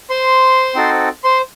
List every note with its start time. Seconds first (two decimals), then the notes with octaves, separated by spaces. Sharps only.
0.10 C5 C6
0.75 C4 D#4 F#4 A4
1.24 C5 C6